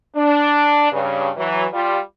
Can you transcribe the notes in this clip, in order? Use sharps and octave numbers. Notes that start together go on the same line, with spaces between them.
D4
G2 C#3
E3 F#3
G3 F4